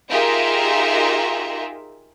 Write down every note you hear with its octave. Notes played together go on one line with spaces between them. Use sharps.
D#4 F4 G4 G#4 A#4 E5